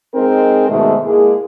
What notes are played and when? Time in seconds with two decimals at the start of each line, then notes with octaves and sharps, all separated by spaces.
0.15 G#3 C4 D#4 G#4 A#4
0.69 G#2 B2 D#3 G#3 A3
1.04 G#3 A#3 E4 G#4